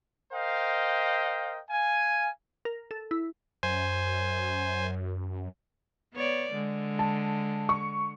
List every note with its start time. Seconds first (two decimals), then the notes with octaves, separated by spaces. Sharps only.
0.32 A#4 C5 D#5 F5 G5
1.70 F5 G#5
2.65 A#4
2.91 A4
3.11 E4
3.63 F#2 C5 G#5
6.14 B3 C#5 D5
6.53 D3 G#3
6.99 A5
7.69 C#6